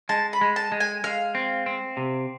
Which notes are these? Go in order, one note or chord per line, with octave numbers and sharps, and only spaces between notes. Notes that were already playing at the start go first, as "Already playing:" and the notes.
G#3 A5
B5
G#3
A5
G#3
G#5
G#3 F5
C4
C4
C3